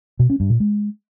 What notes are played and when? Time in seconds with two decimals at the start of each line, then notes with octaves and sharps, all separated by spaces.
0.19 B2
0.30 C#4
0.40 G2
0.50 A#2
0.60 G#3